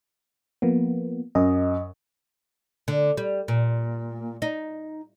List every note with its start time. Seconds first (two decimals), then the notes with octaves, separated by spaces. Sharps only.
0.62 F3 A#3 B3
1.35 F#2 D#5
2.88 D3
3.17 G3
3.48 A#2
4.42 D#4